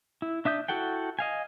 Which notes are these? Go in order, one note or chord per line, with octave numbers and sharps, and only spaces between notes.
E4
D4 E5 D#6 G6
E4 F#4 A4 F#5 G5
D#5 F5 G#5